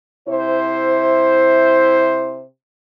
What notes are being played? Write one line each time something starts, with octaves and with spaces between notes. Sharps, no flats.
C3 E4 C5